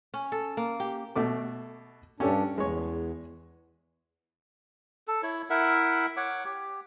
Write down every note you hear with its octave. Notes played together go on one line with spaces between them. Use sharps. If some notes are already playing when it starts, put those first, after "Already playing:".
C#4
A4
A#3
G4
B2 A3 D6
G2 C#4 D4 G4 A4
E2 G#3 C#5
A4
E4 C#5
E4 A#4 E5 F#5
C#5 F#5 D6
G4